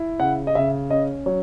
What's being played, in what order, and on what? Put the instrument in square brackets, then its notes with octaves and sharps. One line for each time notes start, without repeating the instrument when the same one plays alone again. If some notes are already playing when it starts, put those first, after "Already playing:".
Already playing: [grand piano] E4
C#3 F#5
D#5
C#3 E5
C#4 D#5
F#3 C#5